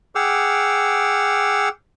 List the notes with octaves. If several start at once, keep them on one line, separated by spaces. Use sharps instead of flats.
G#4 F#5 G5 D6 E6 F6